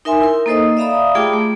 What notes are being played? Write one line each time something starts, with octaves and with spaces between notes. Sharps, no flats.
D#4 A#4 E5 G#5 C6
E4 A#4
A#3 D#4 A4 C5 D#5 D#6
D5 E5 F5 A#5 B5 D#6
A3 F4 G4 G#4 G5 D6
A3